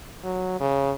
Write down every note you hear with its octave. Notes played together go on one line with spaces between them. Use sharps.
F#3
C#3